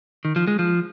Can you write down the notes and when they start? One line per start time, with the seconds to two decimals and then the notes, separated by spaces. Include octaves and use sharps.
0.25 D#3
0.36 F3
0.47 G#3
0.59 F3